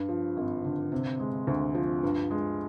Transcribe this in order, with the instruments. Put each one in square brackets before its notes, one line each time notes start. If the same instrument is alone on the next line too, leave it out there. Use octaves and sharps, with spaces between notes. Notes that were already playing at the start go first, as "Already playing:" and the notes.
Already playing: [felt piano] G2
F3
G#1
D3
C3
G#3
D2
F3
G2
G#3